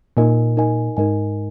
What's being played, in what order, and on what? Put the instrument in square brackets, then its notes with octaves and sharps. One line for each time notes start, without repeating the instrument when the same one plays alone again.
[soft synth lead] A#2 [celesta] D#4 A#4 D#5 G#5
[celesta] D#4 A#4 D#5 G#5
[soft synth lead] G#2 [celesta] D#4 A#4 D#5 G#5